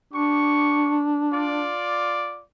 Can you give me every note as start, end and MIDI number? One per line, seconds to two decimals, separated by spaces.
0.13 1.70 62
0.13 0.99 67
0.13 0.99 85
1.33 2.42 65
1.33 2.42 74